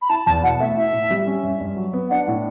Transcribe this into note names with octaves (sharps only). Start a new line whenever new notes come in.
B5
E4 A5
E2 A5
B2 F#5
A3 E5
E4 E5
A2
G3
C#4
G2
G2
F#3
B3
D4 F#5
A2